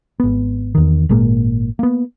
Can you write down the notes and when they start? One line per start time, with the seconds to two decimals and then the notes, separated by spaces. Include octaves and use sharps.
0.20 G#1 B3
0.75 E2 D#3
1.09 G#1 A#2 G#3 A#3
1.79 A#3 B3